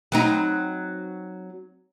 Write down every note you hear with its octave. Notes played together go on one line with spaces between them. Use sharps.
F#3 C4 D#4